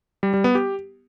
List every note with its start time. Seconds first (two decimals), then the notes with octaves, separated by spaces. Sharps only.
0.23 G3
0.34 G3
0.44 B3
0.55 G4